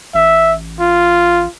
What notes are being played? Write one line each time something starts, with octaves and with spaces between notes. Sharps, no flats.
A1 E5
F4